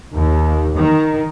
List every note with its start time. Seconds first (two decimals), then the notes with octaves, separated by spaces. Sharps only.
0.14 D#2
0.74 D#3